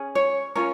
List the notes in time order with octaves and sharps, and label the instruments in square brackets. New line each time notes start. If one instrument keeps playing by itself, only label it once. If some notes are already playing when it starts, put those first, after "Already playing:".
Already playing: [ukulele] C#4 G#4
C#5
C#4 F4 A#4 C#5